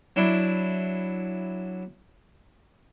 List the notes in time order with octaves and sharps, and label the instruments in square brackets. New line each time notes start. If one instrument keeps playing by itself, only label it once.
[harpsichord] F#3 D4 E4